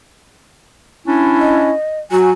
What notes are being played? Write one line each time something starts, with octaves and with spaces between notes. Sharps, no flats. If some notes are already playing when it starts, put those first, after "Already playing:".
C#4 D4 E4
D#5
F#3 F#4 G#5